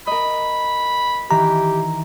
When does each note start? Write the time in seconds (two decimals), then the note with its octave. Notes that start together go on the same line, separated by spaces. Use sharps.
0.07 A#4 D#5 B5
1.31 D#3 E3 G4 A#5